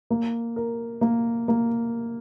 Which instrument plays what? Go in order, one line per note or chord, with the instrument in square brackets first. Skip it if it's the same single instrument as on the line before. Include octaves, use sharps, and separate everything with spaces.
[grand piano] A#3
A#4
A#3
A#3